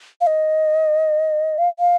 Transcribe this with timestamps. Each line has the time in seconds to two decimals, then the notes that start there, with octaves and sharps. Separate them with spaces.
0.21 F5
0.27 D#5
1.58 F5
1.79 F5